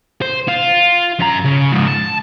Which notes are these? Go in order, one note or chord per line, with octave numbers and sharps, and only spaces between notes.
C5
F4
F#2 A#5
C#3
G#2 F3
A5